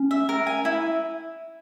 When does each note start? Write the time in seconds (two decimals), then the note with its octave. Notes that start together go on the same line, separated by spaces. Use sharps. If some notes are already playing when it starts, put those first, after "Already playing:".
Already playing: C#4
0.11 E5
0.29 A#4
0.47 G#5
0.65 E4